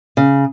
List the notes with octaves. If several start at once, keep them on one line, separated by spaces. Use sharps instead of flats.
C#3